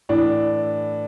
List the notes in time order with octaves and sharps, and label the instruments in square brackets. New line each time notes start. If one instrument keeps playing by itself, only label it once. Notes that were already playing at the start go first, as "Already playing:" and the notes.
[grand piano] A2 E3 D4